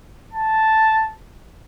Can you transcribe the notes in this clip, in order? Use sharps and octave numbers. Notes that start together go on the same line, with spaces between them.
A5